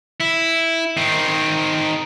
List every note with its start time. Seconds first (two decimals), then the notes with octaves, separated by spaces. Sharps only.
0.20 E4
0.97 D#3 C4